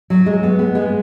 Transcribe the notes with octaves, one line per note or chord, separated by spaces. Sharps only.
F#3
G#3
B3
B3
G#3